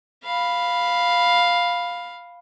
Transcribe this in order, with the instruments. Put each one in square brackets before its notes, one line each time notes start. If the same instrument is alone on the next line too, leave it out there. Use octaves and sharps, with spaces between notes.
[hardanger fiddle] F5 B5